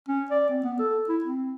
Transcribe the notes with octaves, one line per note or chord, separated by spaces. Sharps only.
C#4
D5
C4
B3
A4
E4
C4